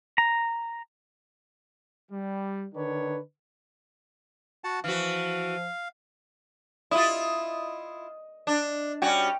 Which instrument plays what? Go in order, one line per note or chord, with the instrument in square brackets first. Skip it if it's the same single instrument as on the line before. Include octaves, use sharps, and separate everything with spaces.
[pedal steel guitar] A#5
[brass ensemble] G3
D3 D#3 D4 B4 C#5
[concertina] F#4 F#5 A5
[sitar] E3 F#4 [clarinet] F3 [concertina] F5
[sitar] E4 F4 [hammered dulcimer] D#5
[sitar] D4
[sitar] G3 C#4 F#4 [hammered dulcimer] G5